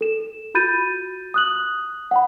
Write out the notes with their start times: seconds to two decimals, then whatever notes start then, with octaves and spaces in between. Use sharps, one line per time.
0.01 A4 E7
0.54 F4 F#4 B5 G6 A6 D#7
1.34 D#6 F#6 F#7
2.11 F#5 G5 B5